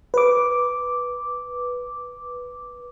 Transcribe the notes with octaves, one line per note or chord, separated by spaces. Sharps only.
B4 D6